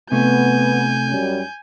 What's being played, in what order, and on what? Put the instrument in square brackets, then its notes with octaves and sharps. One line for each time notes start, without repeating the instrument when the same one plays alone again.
[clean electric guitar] C3 A3 [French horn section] B3 [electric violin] G#5 G6
[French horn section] F#2 G3 C#4